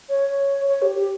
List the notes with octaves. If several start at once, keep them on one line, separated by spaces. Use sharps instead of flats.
C#5
C#5
G4
G4